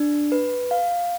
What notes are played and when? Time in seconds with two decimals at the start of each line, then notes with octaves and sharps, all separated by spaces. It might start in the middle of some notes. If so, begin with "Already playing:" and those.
Already playing: D4
0.32 B4
0.71 F5